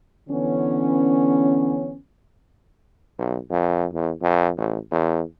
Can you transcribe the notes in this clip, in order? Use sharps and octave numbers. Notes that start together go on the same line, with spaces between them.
D3 E3 B3 C#4
B1
F2
E2
F2
A1
E2